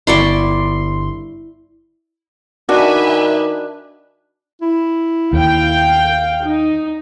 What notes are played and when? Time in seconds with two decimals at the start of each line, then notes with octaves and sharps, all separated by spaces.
0.07 G1 E4 D5 C6 C#6
2.69 D#3 D4 F#4 B4 E5 G#5
4.62 E4
5.33 D#2 F5 G5
6.43 D#4